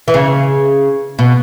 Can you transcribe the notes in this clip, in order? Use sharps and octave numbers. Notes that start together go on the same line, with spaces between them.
E3
C#3
B2